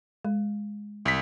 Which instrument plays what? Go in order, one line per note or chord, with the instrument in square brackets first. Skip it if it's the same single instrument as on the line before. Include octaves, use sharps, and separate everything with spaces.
[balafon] G#3
[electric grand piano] C2 B6